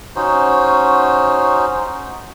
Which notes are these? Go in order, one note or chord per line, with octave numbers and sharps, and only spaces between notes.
C#4 D#4 F#4 C5